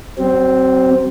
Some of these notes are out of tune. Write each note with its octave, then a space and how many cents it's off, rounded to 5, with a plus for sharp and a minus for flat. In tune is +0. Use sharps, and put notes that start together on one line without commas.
F#3 +45 C4 +0